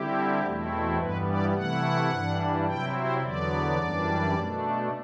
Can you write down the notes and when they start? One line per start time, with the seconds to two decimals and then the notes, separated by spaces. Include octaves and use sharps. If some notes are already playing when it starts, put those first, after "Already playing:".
Already playing: D3 G3 C4 E4 G4
0.41 E2 B2 A3 C4 E4
0.98 G2 E3 G3 B3 B4
1.25 D5
1.54 C3 E3 A3 E4 F#5
2.10 G2 E3 G3 D4
2.66 C3 F#3 C4 E4 G5
2.94 C5
3.22 E2 D3 F#3 B3 D5
3.78 F#2 E3 G3 D4
4.34 B2 A3 D4